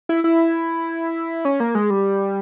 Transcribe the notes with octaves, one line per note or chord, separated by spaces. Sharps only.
E4
E4
C#4
A#3
G#3
G3